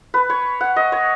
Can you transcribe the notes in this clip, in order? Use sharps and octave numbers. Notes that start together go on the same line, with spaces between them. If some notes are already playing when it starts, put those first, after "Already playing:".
B4
C#5
F#5
D#5
C#5